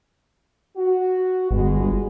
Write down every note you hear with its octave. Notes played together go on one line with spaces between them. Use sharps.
F#4
G1 G#3 B3